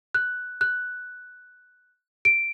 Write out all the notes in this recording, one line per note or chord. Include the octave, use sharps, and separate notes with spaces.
F#6
F#6
D7